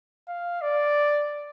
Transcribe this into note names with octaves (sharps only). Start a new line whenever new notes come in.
F5
D5